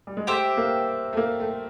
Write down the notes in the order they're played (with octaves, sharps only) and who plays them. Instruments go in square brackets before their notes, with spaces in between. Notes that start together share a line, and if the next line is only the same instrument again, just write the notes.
[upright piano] G3
G#3
[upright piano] A3 [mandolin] G4 C5 E5
[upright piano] A#3
A3
A#3
A3